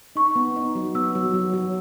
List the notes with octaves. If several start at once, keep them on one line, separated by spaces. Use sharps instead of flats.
D#4 C#6
B3
D#4
F#3
B3 E6
F#3
F#3
F#3